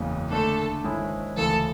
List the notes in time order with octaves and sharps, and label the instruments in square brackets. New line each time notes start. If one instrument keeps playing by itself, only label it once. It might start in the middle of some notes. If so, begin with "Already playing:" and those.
Already playing: [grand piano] F#1 E2 C#3 G#3
[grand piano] D3 A3 D4 [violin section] A4
[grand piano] G#1 G#2 G#3 C#4 E4
[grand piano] D2 C#3 E3 [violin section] A4